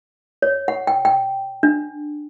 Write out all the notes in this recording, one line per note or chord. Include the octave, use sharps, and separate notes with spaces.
C#5
F#5
G5
G5
D4